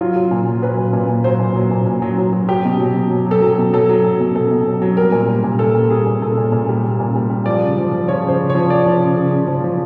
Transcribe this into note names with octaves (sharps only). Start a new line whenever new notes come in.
F#3 F4
F#3
A#2
F#3
F#3 B4
A#2
A#2
A#2
F#3 C5
A#2
F#3
A#2
A#2
F#3
F#3
F#3
F#3 G4
B2
F#3
B2
F#3
F#3 A4
F#3
A4
B2
F#3 A4
F#3
F#3
B2
B2 A4
B2
F#3
F#3
G3 A#4
A#2
G3
A#2
A#2 A4
G3
G3 G#4
A#2
A#2 A4
A#2
A#2
G3
G3
A#2
G3
G3
F3 D5
C#3
F3
F3
F3 C#5
C#3 C5
C#3
C#5
F3
C#3 D5
F3
C#3
C#3
C#3
F3
F3